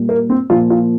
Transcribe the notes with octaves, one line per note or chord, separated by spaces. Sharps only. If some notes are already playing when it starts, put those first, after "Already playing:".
Already playing: A#2 G3
A#3
C4
A#2 F3 F4
F4